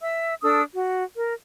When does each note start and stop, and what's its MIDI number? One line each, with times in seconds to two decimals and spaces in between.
0.02 0.34 76
0.02 0.34 88
0.42 0.62 62
0.42 0.62 69
0.42 0.62 87
0.42 0.62 88
0.74 1.03 66
1.16 1.34 70